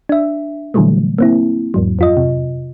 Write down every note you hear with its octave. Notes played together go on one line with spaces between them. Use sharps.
D4 E5
A#2 D3 E3 F#3 G3 A3
A#3 C4 E4
E2 G#2 F#3
F2 F4 D#5
C3